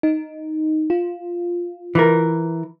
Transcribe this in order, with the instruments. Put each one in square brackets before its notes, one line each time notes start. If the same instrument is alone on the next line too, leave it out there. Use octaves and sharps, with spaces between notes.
[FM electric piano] D#4
F4
[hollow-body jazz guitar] E3 A#4